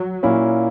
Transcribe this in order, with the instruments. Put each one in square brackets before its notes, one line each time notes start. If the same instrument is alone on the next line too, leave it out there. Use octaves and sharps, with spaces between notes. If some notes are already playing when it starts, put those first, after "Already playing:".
Already playing: [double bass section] F#3
[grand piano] A#2 A#3 C#4 E4